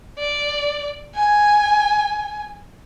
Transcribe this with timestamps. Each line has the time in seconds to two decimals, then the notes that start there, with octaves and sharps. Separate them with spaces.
0.19 D5
1.15 G#5